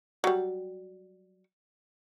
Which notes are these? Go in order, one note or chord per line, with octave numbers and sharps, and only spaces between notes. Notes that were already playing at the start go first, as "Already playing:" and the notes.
F#3 G3